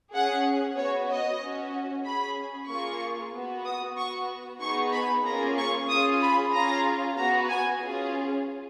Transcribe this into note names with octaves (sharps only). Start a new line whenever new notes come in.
C#4 G#4 F#5
B3 F#4 C#5
D#5
C#4 F#4
C#4 G#4 B5
A#3 F4 G#4 C#6
B3 F#4
D#6
B3 F#4 C#6
B3 D#4 G#4 C#6
B5
A#3 C#4 F4 G#4 A#5
C#6
C#4 F4 G#4 D#6
B5
C#4 F4 G#4 A#5
B3 F#4 A#5
G#5
C#4 F4 G#4